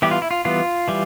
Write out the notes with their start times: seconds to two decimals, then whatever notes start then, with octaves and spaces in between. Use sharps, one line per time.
0.02 E3 G3 B3 G4
0.11 F4
0.22 E4
0.31 F4
0.45 E3 G3 B3 F4
0.88 E3 G3